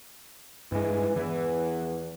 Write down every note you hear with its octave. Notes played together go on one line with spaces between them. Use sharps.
G2 E3 G#3
E2 E3